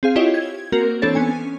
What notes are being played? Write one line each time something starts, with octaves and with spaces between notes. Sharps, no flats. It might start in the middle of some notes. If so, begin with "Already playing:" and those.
C4 G#4 F5
E4 F4 G4 C#5 D#5
G#6
A#3 C4 F#4 A#4
E3 C4 D4 A4 C#5 A6
B3 C#4 G#5